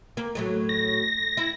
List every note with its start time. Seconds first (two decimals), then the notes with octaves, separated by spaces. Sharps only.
0.17 A#3
0.35 A2 F#3 A3
0.69 A#6
1.37 E4